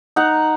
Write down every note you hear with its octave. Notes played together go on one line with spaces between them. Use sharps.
D#4 F#5